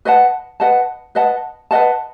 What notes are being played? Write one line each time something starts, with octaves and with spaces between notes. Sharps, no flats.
B4 D#5 F#5 A5
B4 D#5 F#5 A5
B4 D#5 F#5 A5
B4 D#5 F#5 A5